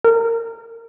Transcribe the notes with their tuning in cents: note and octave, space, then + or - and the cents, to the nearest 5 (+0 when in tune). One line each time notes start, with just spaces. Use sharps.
A#4 -20